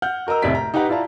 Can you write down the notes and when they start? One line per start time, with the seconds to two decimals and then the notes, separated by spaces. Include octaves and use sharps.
0.02 F#5 F6 G6
0.27 F#4 A#4 D#5 A#5 E6
0.42 F1 A2 C3 D5 B6 D7
0.55 A#5
0.74 D#4 G4 B4 F#5 A#5
0.89 E4 F4 D5 A5 A#5